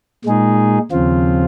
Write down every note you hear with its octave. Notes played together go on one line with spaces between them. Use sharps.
A#2 G#3 D#4 G#4
D#2 C#3 F3 C4 F4